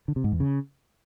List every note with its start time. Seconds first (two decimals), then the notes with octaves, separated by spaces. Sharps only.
0.08 D3
0.16 C3
0.24 G#2
0.32 E2
0.40 C#3